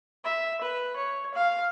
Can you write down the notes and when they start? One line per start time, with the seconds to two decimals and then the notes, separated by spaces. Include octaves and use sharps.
0.24 E5
0.61 B4
0.96 C#5
1.34 F5